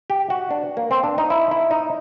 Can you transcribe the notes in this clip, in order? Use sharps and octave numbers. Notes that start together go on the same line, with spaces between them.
G4
F#4
D4
A#3
C4
D4
D#4
E4
E4
D#4